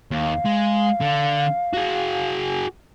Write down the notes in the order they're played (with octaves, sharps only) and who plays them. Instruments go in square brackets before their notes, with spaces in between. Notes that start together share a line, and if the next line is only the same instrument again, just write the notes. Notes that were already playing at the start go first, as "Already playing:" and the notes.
[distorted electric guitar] D#2 [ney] F5
[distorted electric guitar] G#3
D3
F#4 G#4